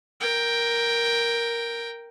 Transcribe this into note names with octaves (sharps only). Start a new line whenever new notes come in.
A#4 G5